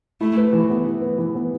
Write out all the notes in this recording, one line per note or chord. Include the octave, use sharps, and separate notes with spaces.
A3 E4
B4
E3
B3
E4
B4
E3
B3